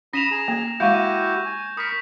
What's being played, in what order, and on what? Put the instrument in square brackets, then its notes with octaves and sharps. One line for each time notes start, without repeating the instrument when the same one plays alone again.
[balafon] C#4 [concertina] B5 D#6 [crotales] A#6 E7 F7
[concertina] G#4 A#5
[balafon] A#3
[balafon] G#3 E5 F5 [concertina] E4 F#4 G4 [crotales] C#6 G6
[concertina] G#5
[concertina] A#4 B5 C#6 [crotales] D#6 B6